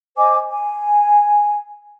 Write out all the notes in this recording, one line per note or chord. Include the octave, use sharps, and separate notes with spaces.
C5 D#5 G#5 D6
G#5